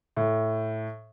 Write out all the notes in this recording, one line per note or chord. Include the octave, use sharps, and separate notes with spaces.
A2